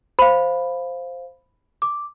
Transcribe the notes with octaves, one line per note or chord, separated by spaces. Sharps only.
C5 F5 B5
D6